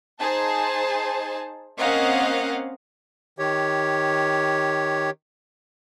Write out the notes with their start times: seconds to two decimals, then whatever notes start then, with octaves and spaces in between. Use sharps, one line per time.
0.19 D#4 G#4 C5 A5
1.79 A#3 C4 C#4 D#5 F5 F#5
3.39 D#3 G4 C#5